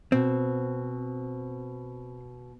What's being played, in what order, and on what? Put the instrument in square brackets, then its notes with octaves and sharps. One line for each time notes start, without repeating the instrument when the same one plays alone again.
[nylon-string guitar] B2 [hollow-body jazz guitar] C4